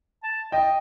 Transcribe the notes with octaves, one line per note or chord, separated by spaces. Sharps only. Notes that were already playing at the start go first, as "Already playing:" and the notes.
A5
D#5 G5